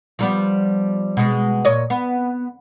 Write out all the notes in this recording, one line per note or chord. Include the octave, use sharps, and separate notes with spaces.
F3 G3 B3
B2 G#3
A#2 C#5 D#5
B3